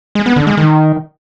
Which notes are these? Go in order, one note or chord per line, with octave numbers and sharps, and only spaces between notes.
G#3
B3
D3
G#3
D#3